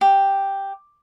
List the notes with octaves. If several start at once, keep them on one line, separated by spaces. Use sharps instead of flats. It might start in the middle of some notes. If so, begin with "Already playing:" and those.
G4